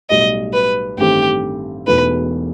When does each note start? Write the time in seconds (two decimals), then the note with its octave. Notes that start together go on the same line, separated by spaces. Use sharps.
0.10 B1 A2 G3 D#5
0.53 B4
0.98 A1 G2 D#3 A3 C4 G4
1.87 E1 E2 B2 A3 D#4 B4